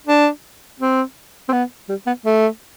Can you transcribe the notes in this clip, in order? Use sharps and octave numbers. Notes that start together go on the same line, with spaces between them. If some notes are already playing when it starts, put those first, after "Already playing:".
D4
C4
C4
B3
G3
B3
A3